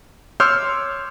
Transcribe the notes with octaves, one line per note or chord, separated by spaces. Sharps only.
C#5 C6 D6 E6 F6 G6